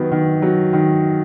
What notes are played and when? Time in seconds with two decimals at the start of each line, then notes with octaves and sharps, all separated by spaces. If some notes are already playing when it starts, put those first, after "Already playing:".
Already playing: D#3 F#3 B3
0.11 D#3
0.42 F#3
0.73 D#3